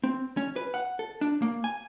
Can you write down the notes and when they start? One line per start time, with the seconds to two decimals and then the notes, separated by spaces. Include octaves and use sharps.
0.04 C4
0.37 C#4
0.56 B4
0.74 F#5
0.99 A4
1.21 D4
1.42 A#3
1.64 G#5